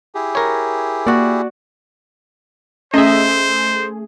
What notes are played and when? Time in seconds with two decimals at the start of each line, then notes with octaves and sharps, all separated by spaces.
0.15 E4 G4 G#4
0.35 A#4 C#5
1.07 A#3 F#4 D5
2.94 A3 C#4 G#4 C5 D#5 E5